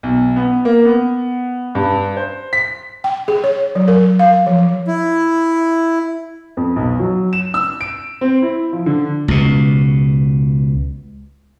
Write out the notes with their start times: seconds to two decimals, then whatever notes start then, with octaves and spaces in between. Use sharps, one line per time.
0.03 B1
0.36 B3
0.65 A#3
0.85 B3
1.75 G2
2.17 C5
2.53 B6
3.04 G5
3.28 G#4
3.44 C#5
3.75 F#3
3.88 A#4
4.19 F5
4.47 F3
4.87 E4
6.57 F2
6.76 B1
6.99 F#3
7.33 E7
7.54 E6
7.81 D7
8.21 C4
8.42 E4
8.73 F3
8.86 D3
9.28 C#2 B2